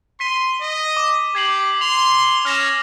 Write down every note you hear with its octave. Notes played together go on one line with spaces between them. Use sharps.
C6 B6 D#7
D#5
D6
G4 G#6 C7 F#7
C6 F7
C#4 F6 A#6 E7